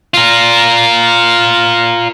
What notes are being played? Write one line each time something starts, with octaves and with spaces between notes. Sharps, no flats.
F4 A#4